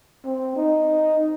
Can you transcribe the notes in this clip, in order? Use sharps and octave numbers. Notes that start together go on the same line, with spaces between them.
C4
D#4